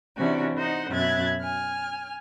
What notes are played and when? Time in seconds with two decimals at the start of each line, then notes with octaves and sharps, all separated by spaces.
0.17 C3 E3 C#4 D4 F#4
0.56 D#4 C5 D#5 F#5
0.90 F#2 B2 E5 F#6 G#6 A6
1.41 G#5 F6